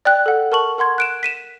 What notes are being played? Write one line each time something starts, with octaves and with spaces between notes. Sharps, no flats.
D5 G5 F#6
A4 F#5
A#4 A5 C#6 F#7
A#4 F#5 C6 G#6
F#6 D7 E7
B6 D#7 E7